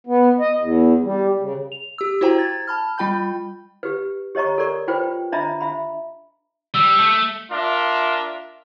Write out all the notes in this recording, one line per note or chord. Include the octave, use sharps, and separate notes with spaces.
B3
D#5
E2
G3
C#3
F7
G4 E6
E4 F#4 C5 G5 A#5
G#6 A6
A5 B5 F6
G3 F4 G5 B5 G6
G4 B4
G4 C#5 D#5 A#5 C#6
A4 A#4 D5 C#6
F4 B4 C5 G5
D4 D#5 E5 A#5 B5
E5 B5
G3 E6
A3
D4 F4 A#4 E5